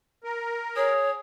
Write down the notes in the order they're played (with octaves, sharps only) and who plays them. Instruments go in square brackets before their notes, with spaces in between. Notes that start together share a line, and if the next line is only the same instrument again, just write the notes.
[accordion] A#4
[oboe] G#4 [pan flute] C#5